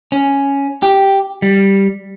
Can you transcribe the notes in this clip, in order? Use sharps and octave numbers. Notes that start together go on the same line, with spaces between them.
C#4
G4
G3